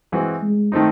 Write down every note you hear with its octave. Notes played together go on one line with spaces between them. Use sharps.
E3 G#3 C4 F#4
G#3
D#3 A3 C4 D#4